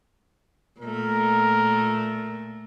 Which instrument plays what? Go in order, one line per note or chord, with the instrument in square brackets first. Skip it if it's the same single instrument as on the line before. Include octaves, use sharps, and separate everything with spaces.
[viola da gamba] A#2 A3 [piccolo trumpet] A#4